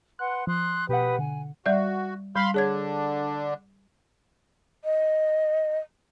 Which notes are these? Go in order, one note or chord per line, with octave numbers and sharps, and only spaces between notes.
B4 F#5 C6 F#6
F3 C6 D#6 F#6
B2 G4 B4 F#5 D#6
D3 G#5
G3 F#4 D5 E5
G3 F5 B5 C6
D3 D4 G#4 C#5 G#6
D#5